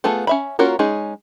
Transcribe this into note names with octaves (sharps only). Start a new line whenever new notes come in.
A3 B3 F4 G#4 A4
C#4 E5 B5
A#3 C#4 F4 F#4 A#4
G#3 C#4 D#4 G#4